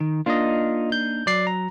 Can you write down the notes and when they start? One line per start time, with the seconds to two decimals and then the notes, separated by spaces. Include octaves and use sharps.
0.01 D#3
0.26 A#3 D4 D#4 F4 D#5
0.92 G6
1.27 F#3 D5 C7
1.47 A#5